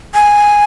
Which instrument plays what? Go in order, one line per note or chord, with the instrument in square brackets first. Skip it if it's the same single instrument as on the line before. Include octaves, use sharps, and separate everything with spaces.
[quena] G#5